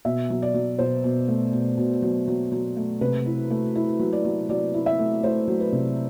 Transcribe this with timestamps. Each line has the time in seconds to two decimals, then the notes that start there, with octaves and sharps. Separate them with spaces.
0.05 B2 E5
0.30 F#3
0.42 D5
0.54 F#3
0.79 B2 C5
1.04 B2
1.28 A3
1.53 B2
1.78 B2
2.02 F#3
2.28 F#3
2.52 F#3
2.77 A3
3.01 C3 B4
3.26 E4
3.50 A3
3.75 E4
3.99 F#3
4.13 D5
4.25 F#3
4.49 F#3 D5
4.74 E4
4.86 E5
4.99 A3
5.23 A3 C5
5.48 F#3
5.60 B4
5.72 C3